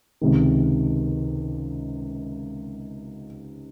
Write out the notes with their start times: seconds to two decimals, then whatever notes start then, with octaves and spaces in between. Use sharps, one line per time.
0.21 C#2 C3 D#3